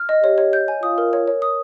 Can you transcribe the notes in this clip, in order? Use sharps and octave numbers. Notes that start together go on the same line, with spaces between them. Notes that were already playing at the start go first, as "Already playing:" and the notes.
Already playing: F6
D#5
G4 C#5
C#5
G6
G#5
F4 D#6
A#4
C#5
C#5
D#6